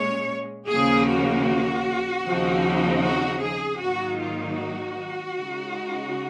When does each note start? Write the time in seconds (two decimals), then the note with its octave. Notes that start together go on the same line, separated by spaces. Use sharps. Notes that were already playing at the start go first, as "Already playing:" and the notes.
Already playing: A#2 G#3 C#4 C#5
0.68 D#2 C#3 F3 A#3 G#4
1.08 F#4
2.24 D#2 C#3 F3 C4 D#4
3.02 F#4
3.41 G#4
3.79 G#2 D#3 F#3 A#3 D#4 F#4
4.18 F4
4.57 F#4
5.34 C#3 G#3 D#4